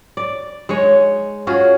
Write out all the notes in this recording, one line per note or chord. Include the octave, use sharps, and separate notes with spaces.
D5
G#3 D#4 C#5
C#4 F4 F#4 G#4